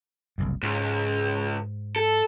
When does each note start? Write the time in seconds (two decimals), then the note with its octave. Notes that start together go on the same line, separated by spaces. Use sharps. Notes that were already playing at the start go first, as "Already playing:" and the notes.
0.38 F#1 C2 F#2
0.63 C#2 G#2
1.96 A4